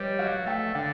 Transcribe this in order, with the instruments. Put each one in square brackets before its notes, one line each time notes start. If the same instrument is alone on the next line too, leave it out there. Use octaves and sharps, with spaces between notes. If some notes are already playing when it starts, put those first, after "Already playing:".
Already playing: [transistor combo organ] G3 [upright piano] B4 C#5 D#5
[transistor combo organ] F#3 [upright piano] D#5 F5
[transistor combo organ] A3 [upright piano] F5 G5
[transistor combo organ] D3 [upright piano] F5 G5